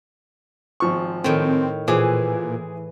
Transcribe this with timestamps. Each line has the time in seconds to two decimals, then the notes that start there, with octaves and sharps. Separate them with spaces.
0.80 G#1 F3 C#6
1.24 A2 D#3 C4
1.88 A#2 E3 G#4 C5 D6